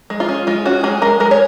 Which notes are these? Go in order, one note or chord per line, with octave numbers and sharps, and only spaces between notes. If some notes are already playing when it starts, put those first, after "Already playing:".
G#3
F4
C#4
G#3 F4
C#4 F#4
G#3 G#4
G#3 A#4
G#3 A#4
C#5